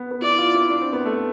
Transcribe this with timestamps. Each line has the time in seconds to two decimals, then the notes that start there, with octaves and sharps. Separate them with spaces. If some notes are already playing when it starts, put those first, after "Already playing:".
Already playing: B3
0.11 B3
0.22 E4 D5
0.38 F4
0.54 E4
0.70 D4
0.81 C4
0.93 B3
1.05 A3